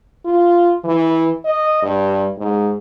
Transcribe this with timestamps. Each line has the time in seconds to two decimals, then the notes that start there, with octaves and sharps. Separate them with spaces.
0.25 F4
0.84 E3
1.45 D#5
1.83 G2
2.38 G#2